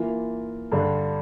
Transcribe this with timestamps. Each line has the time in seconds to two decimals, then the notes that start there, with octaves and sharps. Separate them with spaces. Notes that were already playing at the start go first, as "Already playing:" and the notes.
Already playing: E3 A#3 F4
0.72 G2 D3 G3 D4